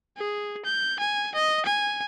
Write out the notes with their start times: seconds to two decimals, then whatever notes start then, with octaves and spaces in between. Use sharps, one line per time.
0.17 G#4
0.65 G6
0.99 G#5
1.35 D#5
1.65 G#5